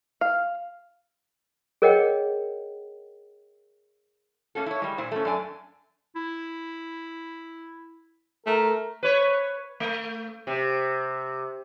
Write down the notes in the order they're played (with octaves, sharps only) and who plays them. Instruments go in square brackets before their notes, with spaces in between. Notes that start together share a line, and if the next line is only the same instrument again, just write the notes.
[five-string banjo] F5
[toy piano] G#4 A#4 C#5 D#5 F#5 G5
[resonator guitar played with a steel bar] A3 A#3 C#4 F#4 A4
E4 C#5
G3 G#3
A#2 E4 C5
A3 C#4
F#2 D4 D5 G#5
[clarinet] E4
[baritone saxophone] A3 [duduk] A#4
[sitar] B4 C#5
A3
C3